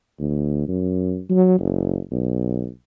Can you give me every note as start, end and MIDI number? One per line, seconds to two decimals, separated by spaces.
0.19 0.66 38
0.68 1.20 42
1.30 1.57 54
1.59 1.98 30
2.11 2.68 35